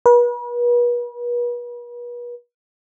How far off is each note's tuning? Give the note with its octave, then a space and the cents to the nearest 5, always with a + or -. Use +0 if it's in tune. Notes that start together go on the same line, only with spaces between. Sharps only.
B4 -40